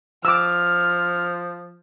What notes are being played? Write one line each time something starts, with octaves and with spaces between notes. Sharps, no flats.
F3 D6 E6 F6